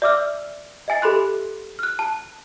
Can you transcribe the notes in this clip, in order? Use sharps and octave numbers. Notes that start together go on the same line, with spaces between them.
D5 E5 D6 E6 F6
D#5 E5 G#5 A6 C7
G4 A4 B5 C6 F#6
F6 F#6
A5